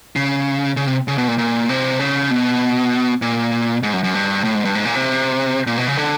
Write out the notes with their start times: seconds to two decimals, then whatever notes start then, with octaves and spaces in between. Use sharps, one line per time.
0.16 C#3
0.77 C#3
0.87 C3
1.08 C#3
1.18 B2
1.28 A#2
1.38 A#2
1.69 C3
1.99 C#3
2.30 B2
3.22 A#2
3.83 G#2
3.93 F#2
4.04 F#2
4.14 G2
4.44 A2
4.55 G#2
4.65 G2
4.75 G#2
4.85 A#2
4.95 C3
5.67 A#2
5.77 B2
5.88 C#3
5.97 D3